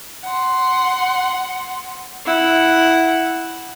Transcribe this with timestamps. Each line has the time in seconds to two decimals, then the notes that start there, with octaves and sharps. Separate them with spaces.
0.24 F#5 C6
2.26 E4 F#5